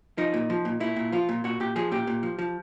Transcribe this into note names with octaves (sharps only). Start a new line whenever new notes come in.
F3 D#4
A#2
F3
A#2
A#2 E4
A#2
F3 F4
A#2
A#2 F#4
A#2 G4
F3 G#4
A#2 G4
A#2
F3
F3